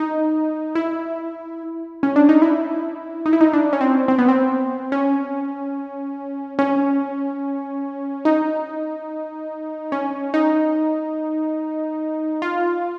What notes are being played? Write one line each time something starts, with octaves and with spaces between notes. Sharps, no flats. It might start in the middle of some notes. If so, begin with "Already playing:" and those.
Already playing: D#4
E4
C#4
D4
D#4
E4
D#4
E4
D#4
D4
C#4
C4
C4
B3
C4
C#4
C#4
D#4
C#4
D#4
F4